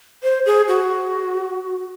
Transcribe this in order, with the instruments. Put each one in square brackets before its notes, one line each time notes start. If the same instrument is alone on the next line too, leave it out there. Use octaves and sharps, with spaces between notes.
[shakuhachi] C5
G#4
F#4